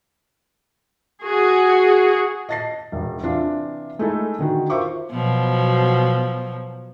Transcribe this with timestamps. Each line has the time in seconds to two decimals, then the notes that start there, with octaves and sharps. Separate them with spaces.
1.22 F#4 G#4
2.49 D#5 A5 A6 A#6 C7
2.92 E1 E2
3.23 C3 E3 D4 F4
3.99 G#3 A3 D#4 E4 G#4 A4
4.39 D3 D#3 F#4
4.70 F4 A#4 C5 E5 C#6 D6
5.10 B2 F3 F#3